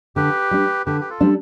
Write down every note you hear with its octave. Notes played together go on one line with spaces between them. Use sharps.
D3 G4 B4
G3 D4
D3 G4 B4
G4
F4 A4
G3 D4